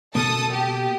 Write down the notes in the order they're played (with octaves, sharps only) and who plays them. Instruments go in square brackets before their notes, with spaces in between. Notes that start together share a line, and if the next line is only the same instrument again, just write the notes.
[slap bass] B2 A#3 [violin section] A4 A5 D#6
[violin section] G4